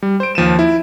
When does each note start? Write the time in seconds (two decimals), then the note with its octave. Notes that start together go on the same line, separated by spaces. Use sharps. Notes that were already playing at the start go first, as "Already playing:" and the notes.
0.03 G3
0.20 C5 D7
0.35 D#2 F3 D#7 E7
0.59 E4